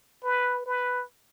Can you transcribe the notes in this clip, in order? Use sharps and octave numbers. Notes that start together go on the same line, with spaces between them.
B4
B4